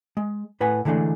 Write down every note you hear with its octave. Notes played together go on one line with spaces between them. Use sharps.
G#3
A2 B4 F#5 G#5
D3 E3 G#3 A3 D4